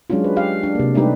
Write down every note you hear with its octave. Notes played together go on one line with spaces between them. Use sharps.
F#3 G#3 C#4 D4 F4
B4
G4 F5
D4
C3 A#3
G3 A3 D4 D#4 G4 B4